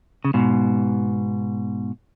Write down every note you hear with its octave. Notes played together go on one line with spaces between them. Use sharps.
C#3
G#2 B2